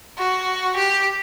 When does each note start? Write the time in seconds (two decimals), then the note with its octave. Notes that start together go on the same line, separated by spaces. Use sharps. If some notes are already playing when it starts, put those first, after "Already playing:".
0.18 F#4
0.77 G4